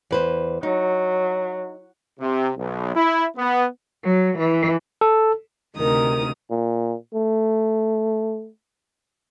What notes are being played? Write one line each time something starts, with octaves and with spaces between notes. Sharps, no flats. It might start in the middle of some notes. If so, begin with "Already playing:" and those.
E2 B4 C5
F#3 D#4
C3
B1
E4
B3
F#3
E3
A4
D2 C3 D#3 A#4 D#6
A#2
A3